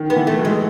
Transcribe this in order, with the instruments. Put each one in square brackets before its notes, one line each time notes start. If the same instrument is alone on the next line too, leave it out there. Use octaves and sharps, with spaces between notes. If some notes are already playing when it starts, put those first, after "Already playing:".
Already playing: [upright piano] D#3
[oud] B3
[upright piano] E3
[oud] A3
[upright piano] F#3
[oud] G#3